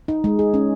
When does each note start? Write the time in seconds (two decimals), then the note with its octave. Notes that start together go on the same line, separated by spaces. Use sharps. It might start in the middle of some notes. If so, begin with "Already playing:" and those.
0.08 D#4
0.24 G#3
0.39 G#4
0.54 C#4